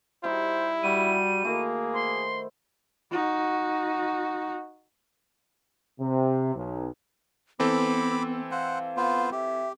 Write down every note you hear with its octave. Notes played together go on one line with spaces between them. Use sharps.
G3 D#4 E4 G4 C5
G3 F#4 D#7
D#3 A3 A#3 E4 G#4
C5 C6
D#4 F#4
C3
B1
E3 B3 C4 A4 B5 D6
C5 F5 F#5
B3 F4 C5
G4 E5